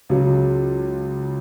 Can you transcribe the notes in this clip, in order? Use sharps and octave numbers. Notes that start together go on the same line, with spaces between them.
C#2 C#3 F#3